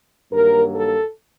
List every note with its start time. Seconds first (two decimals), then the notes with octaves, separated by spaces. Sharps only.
0.32 G2 D#3 F#3 A#3 A#4
0.74 A4